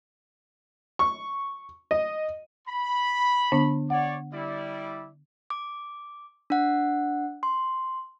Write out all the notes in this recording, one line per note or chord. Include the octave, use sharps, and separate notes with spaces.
C#6
D#5
B5
D3 B3 D4
C#5 D5 F#5
G3 E4 D5
D6
D4 F#5
C6